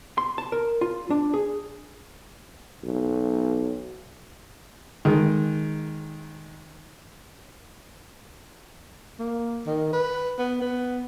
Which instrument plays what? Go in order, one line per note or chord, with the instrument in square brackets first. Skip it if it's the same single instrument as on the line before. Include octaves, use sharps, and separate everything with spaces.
[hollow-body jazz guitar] C6
A5
A#4
F4
D4
G#4
[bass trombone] B1
[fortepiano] D#3 G#3
[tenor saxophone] A#3
D#3
B4
B3
B3